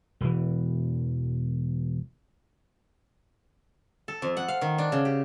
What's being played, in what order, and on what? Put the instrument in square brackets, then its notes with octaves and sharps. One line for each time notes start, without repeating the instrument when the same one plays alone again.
[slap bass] E1 E2 E3
[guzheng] A4
F2
F#5
F5
D#3
D4
C#3
G4